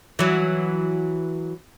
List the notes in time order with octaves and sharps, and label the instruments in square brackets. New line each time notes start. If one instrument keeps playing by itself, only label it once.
[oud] E3 F#3